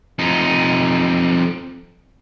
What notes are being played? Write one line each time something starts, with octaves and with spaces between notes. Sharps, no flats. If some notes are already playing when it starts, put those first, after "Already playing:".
F2 D#4